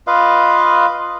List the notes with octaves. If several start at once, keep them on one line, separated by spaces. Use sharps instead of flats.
F4 B4 D#5 F5